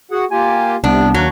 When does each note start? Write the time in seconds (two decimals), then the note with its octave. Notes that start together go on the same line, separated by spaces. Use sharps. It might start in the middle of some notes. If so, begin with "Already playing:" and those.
0.11 F#4 G#4 F#5
0.31 A#3 F4 G4 G#5
0.84 C2 C3 B3 D4
1.14 D#2 F#3 D4 F5